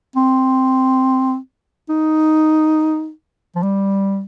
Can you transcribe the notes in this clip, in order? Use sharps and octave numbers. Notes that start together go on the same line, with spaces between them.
C4
D#4
F3
G3